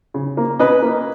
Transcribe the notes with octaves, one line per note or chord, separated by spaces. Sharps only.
C#3
A#3
C#4 B4 D#5
A#3